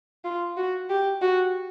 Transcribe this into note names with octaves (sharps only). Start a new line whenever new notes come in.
F4
F#4
G4
F#4